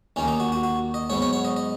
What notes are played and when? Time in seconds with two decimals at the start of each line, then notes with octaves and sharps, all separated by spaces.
0.16 D#2 D#3 A#3 C#4
0.28 D#4
0.40 F#4
0.52 F#4
0.63 F#4
0.94 D#5
1.10 G#2 F#3 B3 C#5
1.22 C#5
1.33 C#5
1.45 D#5
1.56 D#5